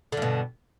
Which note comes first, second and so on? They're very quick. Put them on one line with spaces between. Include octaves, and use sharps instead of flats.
D3 G2 B2